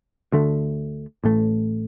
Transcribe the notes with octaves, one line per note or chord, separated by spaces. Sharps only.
D2 D3 A3
A1 A2 A3